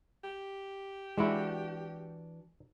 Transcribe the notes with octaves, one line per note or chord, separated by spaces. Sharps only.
G4
E3 G#3 D4 E4 F#4